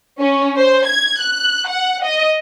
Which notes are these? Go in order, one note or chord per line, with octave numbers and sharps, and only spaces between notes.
C#4
C5
G#6
F#6
F#5
D#5